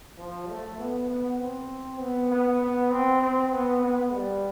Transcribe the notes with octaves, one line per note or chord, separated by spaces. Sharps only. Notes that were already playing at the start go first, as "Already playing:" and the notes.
F3
A3
B3
B3
C4
B3
B3
B3
C4
C4
B3
B3
G3